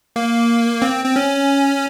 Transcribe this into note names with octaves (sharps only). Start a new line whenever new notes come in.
A#3
C4
C4
C#4